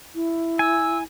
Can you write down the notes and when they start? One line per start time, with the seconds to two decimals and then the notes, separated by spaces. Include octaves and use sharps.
0.15 E4
0.59 G#5 E6